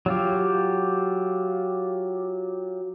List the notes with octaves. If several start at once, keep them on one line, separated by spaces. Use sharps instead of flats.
F#3 F4 G4